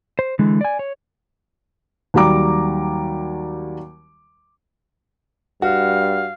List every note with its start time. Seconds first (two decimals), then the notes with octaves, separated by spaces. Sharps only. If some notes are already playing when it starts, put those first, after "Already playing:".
0.19 C5
0.39 D3 E3 G#3
0.61 D5 G#5
0.79 C#5
2.14 D#2 F#3 G3 A#5 D6
5.62 G2 F#4 F5